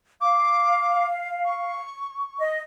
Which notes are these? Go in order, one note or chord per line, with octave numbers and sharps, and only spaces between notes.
F5 D6
C#6
D#5